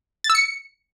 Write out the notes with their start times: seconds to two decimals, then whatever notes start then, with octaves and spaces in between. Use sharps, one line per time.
0.24 A6
0.30 E6
0.35 C#7